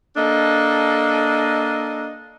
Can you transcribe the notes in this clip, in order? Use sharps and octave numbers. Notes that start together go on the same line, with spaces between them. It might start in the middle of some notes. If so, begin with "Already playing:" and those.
A#3 D4 A4 D#5